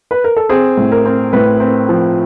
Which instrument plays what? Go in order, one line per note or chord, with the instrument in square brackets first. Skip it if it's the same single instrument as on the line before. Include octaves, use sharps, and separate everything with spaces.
[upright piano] B4
A#4
A4
C4 G#4
A2
A#4
C4
A2 B4
C4
F3